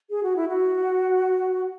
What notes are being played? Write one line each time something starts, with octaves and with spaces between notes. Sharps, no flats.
G#4
F#4
E4
F#4